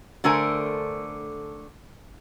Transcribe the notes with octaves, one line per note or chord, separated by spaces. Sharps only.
D3 A3 A#4 C5 G#5